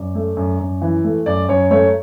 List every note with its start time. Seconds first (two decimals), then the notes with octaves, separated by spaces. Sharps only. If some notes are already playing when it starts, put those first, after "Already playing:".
Already playing: F#2 D5
0.15 A3
0.37 F#2
0.60 F#2
0.82 E3
1.04 A3
1.26 F#2 D5
1.48 F#2 C#5
1.71 A3 C#5